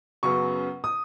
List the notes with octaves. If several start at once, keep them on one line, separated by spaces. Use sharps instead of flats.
F#2 C#3 F#3 B3 C#6
D#6